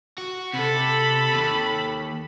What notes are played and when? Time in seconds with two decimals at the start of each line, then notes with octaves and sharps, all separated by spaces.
0.18 F#4
0.54 C3 A4 B5
1.33 D#2